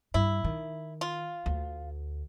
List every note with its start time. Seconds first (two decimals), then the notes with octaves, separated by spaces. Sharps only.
0.14 G2 E4
0.44 D#3
1.01 F4
1.46 D2